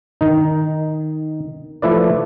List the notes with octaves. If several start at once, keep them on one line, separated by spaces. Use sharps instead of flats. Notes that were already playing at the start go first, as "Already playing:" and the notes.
D#3 D#4
F3 A3 E4 B4 D5